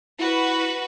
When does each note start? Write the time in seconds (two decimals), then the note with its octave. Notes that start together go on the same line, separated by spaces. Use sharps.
0.19 E4 F#4 B4